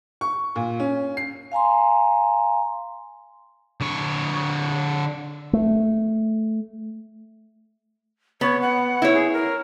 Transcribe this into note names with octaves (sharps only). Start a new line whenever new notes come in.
C#6
A#2
C#4
C7
F5 G#5 A#5 C6
D3 C#5
A3
B3 C#5
F#5
E4 C#5
G#4
A#4